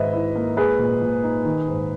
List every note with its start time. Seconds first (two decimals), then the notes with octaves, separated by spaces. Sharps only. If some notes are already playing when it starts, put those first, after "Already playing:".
Already playing: G#2 D#3 B4 D#5 E5
0.13 E4
0.36 A#3
0.57 G#3 G#4 B4
0.79 A#2
1.02 A#2
1.23 D#4
1.45 D#3
1.68 G#2